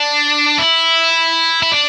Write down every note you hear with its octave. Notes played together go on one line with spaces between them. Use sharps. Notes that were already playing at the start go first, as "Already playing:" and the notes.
Already playing: D4
E4
E4
D4